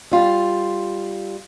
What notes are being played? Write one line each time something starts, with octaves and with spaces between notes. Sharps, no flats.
G3 F4